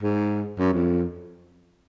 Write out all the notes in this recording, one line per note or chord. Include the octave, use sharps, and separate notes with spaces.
G#2
F#2
F2